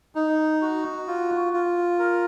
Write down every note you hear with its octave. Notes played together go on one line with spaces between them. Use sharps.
D#4
F#4
F4
F4
A#4